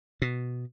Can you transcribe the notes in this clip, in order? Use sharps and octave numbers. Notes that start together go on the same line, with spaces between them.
B2